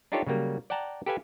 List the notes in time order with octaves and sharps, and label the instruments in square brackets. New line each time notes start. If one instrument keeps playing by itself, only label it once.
[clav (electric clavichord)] D4 D#4 F4 G4 A4 C#5
C#3 F#3 G3 A#3
D5 F#5 G5 A5 A#5
G4 A4 B4 F5 G#5